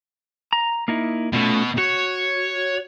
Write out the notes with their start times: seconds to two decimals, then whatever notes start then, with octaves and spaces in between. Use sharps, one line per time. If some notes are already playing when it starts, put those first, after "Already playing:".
0.53 A#5
0.88 A#3 D#4 E4
1.33 B2 A3 C#4 F4
1.78 F#4 C#5